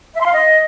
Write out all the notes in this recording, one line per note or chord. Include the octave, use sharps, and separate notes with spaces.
E5
C6
F5
D#5